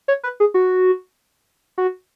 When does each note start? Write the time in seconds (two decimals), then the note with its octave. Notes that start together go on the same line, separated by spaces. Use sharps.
0.08 C#5
0.24 B4
0.40 G#4
0.54 F#4
1.78 F#4